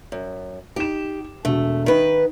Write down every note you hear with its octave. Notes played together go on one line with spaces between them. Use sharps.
F#2
D#4 G4 E7
E1 A3 F#4
D#3 D#4 B4